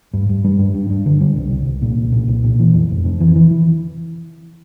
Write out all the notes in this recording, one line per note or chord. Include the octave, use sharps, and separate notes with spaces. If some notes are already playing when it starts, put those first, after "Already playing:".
G2
G2
G3
G2
G2
G2
D3
G3
C2
C2
C2
A#2
C2
A#2
C2
A#2
E3
F2
F1
F2
E3
E3
E3